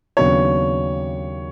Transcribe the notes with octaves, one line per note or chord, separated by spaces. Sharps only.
D#2 C#3 F#3 B3 D4 C#5